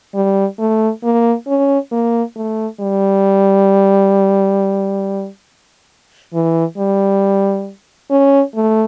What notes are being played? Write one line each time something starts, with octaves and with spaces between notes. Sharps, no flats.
G3
A3
A#3
C#4
A#3
A3
G3
E3
G3
C#4
A3